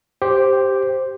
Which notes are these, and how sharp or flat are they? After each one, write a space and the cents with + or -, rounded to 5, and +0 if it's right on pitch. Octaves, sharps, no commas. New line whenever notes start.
G4 +0 C5 +0